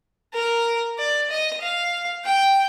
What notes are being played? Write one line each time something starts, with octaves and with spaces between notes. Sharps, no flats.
A#4
D5
D#5
F5
G5